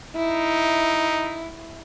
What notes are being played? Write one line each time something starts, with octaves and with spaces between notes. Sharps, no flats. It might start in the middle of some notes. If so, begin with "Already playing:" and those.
D#4 E4